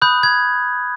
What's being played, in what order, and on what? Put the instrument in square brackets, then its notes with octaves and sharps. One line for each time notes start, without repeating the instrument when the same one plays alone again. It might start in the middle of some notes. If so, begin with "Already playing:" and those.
[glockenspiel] B5 D#6 F#6 G6
G#6